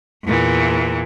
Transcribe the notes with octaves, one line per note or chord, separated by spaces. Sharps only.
E2 A#2 E3